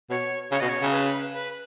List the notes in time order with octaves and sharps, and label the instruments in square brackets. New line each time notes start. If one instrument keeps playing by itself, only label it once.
[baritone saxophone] B2 [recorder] C#5
[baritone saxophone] C#3 [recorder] C#5
[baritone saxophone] B2 [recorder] D#5
[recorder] C#5
[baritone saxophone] C#3
[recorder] B4
B4